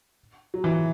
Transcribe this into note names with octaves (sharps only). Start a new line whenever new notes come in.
F#3
E3